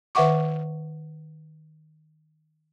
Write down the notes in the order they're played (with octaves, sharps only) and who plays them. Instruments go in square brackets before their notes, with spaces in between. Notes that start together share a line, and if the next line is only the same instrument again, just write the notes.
[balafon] D#3 B4 E5 F#5 C#6 D6